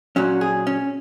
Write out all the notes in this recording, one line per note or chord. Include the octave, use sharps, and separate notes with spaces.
A#2 F#3 C#4 F#4
G#4
C#4